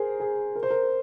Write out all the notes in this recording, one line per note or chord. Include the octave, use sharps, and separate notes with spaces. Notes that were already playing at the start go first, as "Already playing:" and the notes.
Already playing: G#4 A#4 C5
G#4
A#4
C5
A#4